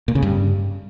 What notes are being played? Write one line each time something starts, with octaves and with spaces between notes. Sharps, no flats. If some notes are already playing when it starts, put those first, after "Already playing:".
A#2
C#3
G2